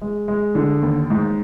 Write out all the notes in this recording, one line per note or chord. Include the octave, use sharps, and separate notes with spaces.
G#3
G#3
D3
D#2
G#2